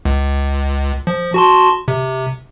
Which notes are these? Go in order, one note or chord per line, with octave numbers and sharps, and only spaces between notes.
C#2
F3
F#4 A5 C6
C3